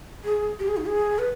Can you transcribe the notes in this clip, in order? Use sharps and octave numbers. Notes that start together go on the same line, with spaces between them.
G#4
G4
G#4
D#4
G#4
B4